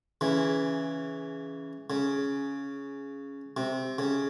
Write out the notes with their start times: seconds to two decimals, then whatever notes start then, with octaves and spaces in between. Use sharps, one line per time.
0.21 C#3 E3
1.90 C#3
3.57 C3
3.98 C#3